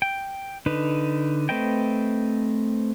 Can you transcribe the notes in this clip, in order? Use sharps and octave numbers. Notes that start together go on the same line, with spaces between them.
G5
D3 D#4 B4
A3 C4 B4 D#5 G5